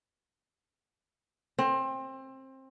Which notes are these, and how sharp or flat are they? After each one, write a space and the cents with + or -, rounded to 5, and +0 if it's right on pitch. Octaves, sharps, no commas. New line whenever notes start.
C4 +25